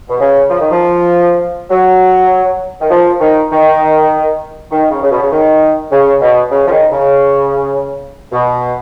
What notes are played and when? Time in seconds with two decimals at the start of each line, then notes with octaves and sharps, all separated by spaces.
0.09 B2
0.20 C#3
0.50 F3
0.60 D#3
0.71 F3
1.70 F#3
2.81 D#3
2.91 F3
3.20 D#3
3.51 D#3
4.71 D#3
4.91 C#3
5.03 C#3
5.11 B2
5.22 C#3
5.32 D#3
5.91 C#3
6.21 B2
6.51 C#3
6.67 F3
6.71 D#3
6.91 C#3
8.32 B2